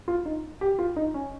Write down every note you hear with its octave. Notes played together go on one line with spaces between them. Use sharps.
F4
D#4
G4
F4
D#4
C#4